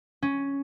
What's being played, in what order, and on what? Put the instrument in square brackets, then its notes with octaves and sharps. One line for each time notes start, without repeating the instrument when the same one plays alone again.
[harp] C#4